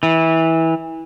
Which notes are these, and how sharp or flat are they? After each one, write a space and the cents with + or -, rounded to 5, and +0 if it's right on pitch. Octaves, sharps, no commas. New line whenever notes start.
E3 -20